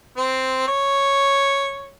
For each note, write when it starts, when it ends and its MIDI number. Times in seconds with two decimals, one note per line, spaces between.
0.17 0.64 60
0.68 1.93 73